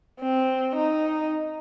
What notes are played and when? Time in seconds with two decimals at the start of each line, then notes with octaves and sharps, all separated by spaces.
0.21 C4
0.76 D#4